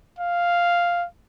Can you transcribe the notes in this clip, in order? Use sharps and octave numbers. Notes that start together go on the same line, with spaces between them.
F5